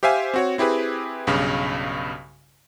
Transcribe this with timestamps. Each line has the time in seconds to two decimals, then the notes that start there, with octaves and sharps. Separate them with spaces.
0.03 G4 C5 E5 F5 G#5
0.34 C4 F#4 C#5
0.58 C4 E4 G4 G#4 B4
1.27 B1 G2 C#3